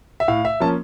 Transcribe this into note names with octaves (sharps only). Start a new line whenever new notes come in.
E5
A2 F5
E5
F3 A#3 C#4 A5